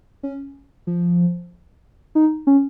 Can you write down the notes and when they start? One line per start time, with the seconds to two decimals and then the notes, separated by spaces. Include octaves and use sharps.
0.23 C#4
0.87 F3
2.15 D#4
2.47 C#4